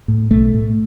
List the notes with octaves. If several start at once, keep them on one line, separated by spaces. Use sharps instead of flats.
A2
B1 A3
A2